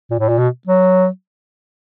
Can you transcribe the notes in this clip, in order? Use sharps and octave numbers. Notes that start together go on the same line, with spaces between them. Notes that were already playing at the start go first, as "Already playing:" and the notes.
A#2
A2
A#2
B2
F#3